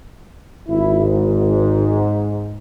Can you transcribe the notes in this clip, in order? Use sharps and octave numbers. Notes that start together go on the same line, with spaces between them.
G#1 E4
G#2